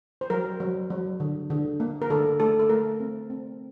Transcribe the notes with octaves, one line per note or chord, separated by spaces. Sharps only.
C5
F#3 A#4
F#3
F#3
D3
D3
A#3
A#4
D3 A4
A3 A4
A4
A3 A#4
C4
C4